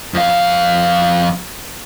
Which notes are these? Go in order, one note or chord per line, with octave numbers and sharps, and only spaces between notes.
F2 F5